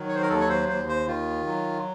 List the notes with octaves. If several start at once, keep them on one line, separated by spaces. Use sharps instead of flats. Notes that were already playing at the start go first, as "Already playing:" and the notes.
Already playing: D#3 F#3
C#5
C5
A#4
D#2 A4
C#5
C5
D#2 C5
C5
D#3 F4
F#3